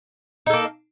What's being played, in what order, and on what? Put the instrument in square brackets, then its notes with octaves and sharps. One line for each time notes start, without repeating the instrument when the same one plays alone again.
[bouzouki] D#4
A4
A#3